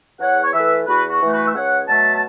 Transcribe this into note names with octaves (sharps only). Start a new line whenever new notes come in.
E2 C#5 F#5
C#5
E3 A3 B4 E5
E2 F#4 B4
F#4
E3 A3
F#4 B4
E5
C#2 C#5 F#5
B2 F#3 A3 E5 A5
A5